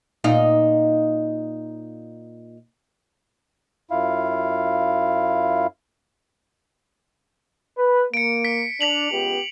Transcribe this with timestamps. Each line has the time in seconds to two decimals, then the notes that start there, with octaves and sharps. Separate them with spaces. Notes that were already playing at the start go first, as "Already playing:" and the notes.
0.24 A#2 D#4 F5
3.91 F#2 E4 F4 F5
7.77 B4
8.14 A#3 C#7 D7
8.45 B6
8.81 D4 B6 F7 F#7
9.11 C#2 B3 G4